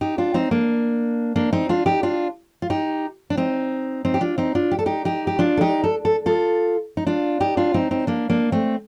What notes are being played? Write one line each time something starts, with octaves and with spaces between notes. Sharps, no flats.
D#4 G4
D4 F4
C4 D#4
A#3 D4
A#3 D4
C4 D#4
D4 F4
D#4 G4
D4 F4
F4
D#4 G4
D4
C4 D#4
C4 D#4
G4
D4 F4
C4 D#4
D4 F4
G4
A4
D#4 G4
D#4 G4
G4
D4 F4
A4
D#4 G4
A4
A4
F4 A4
D#4
D4 F4
D#4 G4
D4 F4
C4 D#4
C4 D#4
A#3 D4
A#3 D4
A3 C4